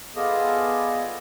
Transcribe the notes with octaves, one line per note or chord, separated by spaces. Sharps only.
B3 F4 G#4 A4 D5 D#5